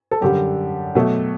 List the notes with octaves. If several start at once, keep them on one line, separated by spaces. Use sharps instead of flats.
A4
F#2 D3 G3 G4
B2 F#3 A3